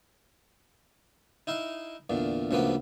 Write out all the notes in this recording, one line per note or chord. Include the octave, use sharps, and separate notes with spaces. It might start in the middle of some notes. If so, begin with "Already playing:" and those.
D#4 E4 F5
E2 A#2 D3
D2 C#3 F3 A#3 B3 B4